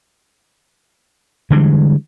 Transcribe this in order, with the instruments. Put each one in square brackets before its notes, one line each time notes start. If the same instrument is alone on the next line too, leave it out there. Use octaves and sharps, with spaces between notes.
[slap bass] D3 E3 G3 G#3